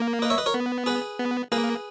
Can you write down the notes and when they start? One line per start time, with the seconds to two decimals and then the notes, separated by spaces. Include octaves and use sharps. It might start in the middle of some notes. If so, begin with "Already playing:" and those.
Already playing: A#3
0.22 B4 D#5
0.30 C#5 E5
0.38 B4 D#5
0.46 A#4 C#5
0.54 B3
0.86 G#4 B4
1.19 B3
1.52 A#3 G#4 B4